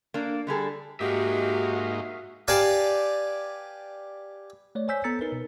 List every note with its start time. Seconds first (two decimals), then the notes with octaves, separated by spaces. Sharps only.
0.14 A#3 D4
0.47 D3 G3 G#4 A4
1.00 G#2 A#3 D#4 F#4 G4 E5 F5
2.48 G4 B4 D5 F5 G#5 A5
4.75 A3 C#5 D5
4.88 C5 C#5 G#5 E6 G6 B6
5.04 B3 A4 A#5 E6 A6 C#7
5.21 D#4 A#4 B4
5.32 B2